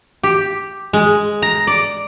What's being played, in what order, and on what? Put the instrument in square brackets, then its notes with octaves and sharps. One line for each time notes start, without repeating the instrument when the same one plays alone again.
[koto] G4
G#3
A#5
D5